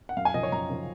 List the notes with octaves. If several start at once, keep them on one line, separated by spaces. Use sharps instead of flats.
F#5
F#2 F5
G#5
C#3 F3 D#5
C#5
F#2 A#5
C#3 F3